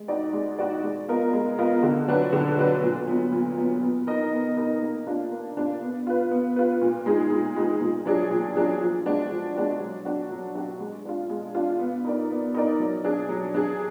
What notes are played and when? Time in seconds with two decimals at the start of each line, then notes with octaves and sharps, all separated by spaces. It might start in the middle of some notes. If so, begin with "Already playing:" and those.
Already playing: G#3
0.08 D#4 F#4 D5
0.33 G#3
0.58 D#4 F#4 D5
0.83 G#3
1.08 B3 F4 A#4 D#5
1.33 G#3
1.58 B3 F4 A#4 D#5
1.83 D3
2.08 F#3 D4 F#4 B4
2.33 D3
2.58 F#3 D4 F#4 B4
2.83 A#2
3.08 F#3 B3
3.32 A#2
3.57 F#3 B3
3.82 B3
4.07 D#4 A#4 D#5
4.32 B3
4.57 D#4 A#4 D#5
4.82 A#3
5.07 D4 F4
5.32 A#3
5.57 D4 F4
5.82 B3
6.07 F4 B4
6.31 B3
6.56 F4 B4
6.82 A#2
7.06 G#3 D#4 G#4
7.31 A#2
7.56 G#3 D#4 G#4
7.81 A#2
8.05 F#3 D4 G#4
8.31 A#2
8.56 F#3 D4 G#4
8.81 F3
9.06 G#3 D4 F#4
9.30 F3
9.55 G#3 D4 F#4
9.80 F#3
10.05 D4 F#4
10.30 F#3
10.55 D4 F#4
10.80 G#3
11.05 D4 F4
11.30 G#3
11.55 D4 F4
11.79 B3
12.05 D#4 A#4 D5
12.29 B3
12.55 D#4 A#4 D5
12.80 F#3
13.04 D4 G#4
13.29 F#3
13.54 D4 G#4